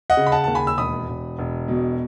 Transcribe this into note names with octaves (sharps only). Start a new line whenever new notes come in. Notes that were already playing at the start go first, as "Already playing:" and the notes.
D#5 F#5
C#3
B5
F#5 A5
D#2 A5
G#5 B5
E6
E1 B5 D#6
E1
E1
B2